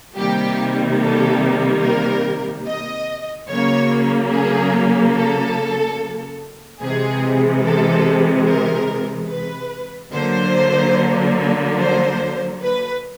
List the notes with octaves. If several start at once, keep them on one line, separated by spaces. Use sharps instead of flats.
C3 D#3 G3 A#3 G4
A4
A#4
D#5
C#3 F#3 A#3 C#5
G#4
A4
C3 E3 G#3 G#4
A4
A#4
B4
D3 F#3 A#3 C5
C5
B4